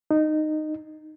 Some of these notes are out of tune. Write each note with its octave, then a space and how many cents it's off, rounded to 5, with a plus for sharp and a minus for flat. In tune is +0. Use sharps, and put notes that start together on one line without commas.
D#4 -15